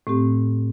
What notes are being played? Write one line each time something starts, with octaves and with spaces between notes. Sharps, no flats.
A2 A3 C4 G4